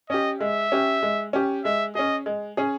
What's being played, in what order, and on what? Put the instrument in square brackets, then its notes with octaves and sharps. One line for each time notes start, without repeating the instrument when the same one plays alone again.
[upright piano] C#4 G4 [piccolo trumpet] D#5
[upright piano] G#3 [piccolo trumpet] E5
[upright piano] C#4 G4
G#3
C#4 G4
[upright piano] G#3 [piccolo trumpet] E5
[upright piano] C#4 G#4 [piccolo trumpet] D#5
[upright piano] G#3
C#4 G#4